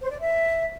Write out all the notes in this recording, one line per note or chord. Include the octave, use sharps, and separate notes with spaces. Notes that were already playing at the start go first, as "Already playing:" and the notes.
C5
D5
E5